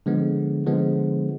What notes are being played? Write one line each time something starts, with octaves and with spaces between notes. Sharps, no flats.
D3 F3 G#3 B3
D3 F3 G#3 B3